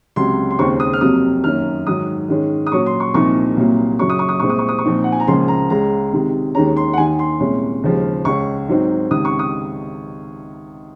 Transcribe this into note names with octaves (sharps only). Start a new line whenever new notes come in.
C#2 C3 F#3 C6
C6
D#2 C#3 G#3 C4 C#6
D#6
F6
F2 C3 F#3 A#3 D#6
F#2 D#3 A#3 C#4 F6
G#2 D#3 F#3 D#6
G#2 D#3 G#3 C#4
D#6
A#2 F#3 C#4 C#6
C6
C#6
C2 A#2 F3 A#3 D#4 C#6
C2 A#2 F#3 A#3
F#2 C#3 F#3 C#4 C#6
D#6
C#6
D#6
C2 A#2 G#3 C4 C#6
D#6
C#6
D#6
C#6
A#2 F3 C4 D#4
F#5
G#5
A#5
C#2 C#3 F3 A#3 C6
A#5
C#2 C#3 G#3 A#5
C3 D#3 G#3
D#2 D#3 G#3 C#4 A#5
C6
F#5
D#2 D#3 A#3 G#5
C6
C2 A#2 G#3 C#4
D#2 C#3 F3 G#3
C#2 C#3 G#3 C#4 C#6
G#2 F#3 C4 D#4
C#2 C3 D#3 D#6
C#6
D#6